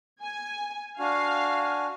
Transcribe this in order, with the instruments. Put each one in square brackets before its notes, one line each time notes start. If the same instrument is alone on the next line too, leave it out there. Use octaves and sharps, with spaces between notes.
[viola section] G#5
[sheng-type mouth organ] D4 F#4 G#5 [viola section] F5